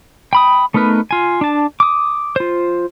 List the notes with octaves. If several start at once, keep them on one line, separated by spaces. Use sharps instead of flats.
G5 B5 D#6
A3 B3 D#4 A#4 B4
F4 G#5
D4 A5
D6 D#6
F4 C5